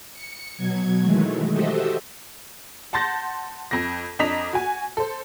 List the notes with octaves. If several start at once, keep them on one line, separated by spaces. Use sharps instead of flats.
C#7
B2 F#3 G#6
D#3 E3 F#3 G#3 A3
F#4 G4 A4 C5 D#5 E5
F#5 A5 C6 G6 A6 A#6
F2 A#6
F2 D4 D#5 A#5 B6 F7
F#4 G#5
A4 C5